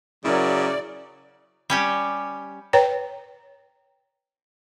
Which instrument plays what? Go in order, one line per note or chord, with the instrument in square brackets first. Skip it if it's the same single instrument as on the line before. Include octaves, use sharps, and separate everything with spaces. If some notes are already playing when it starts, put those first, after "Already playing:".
[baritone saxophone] C#3 [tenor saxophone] F#3 [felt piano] E4 A#4 [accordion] D5
[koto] G3 C#4 G4
[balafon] B4 C#5 G5 A#5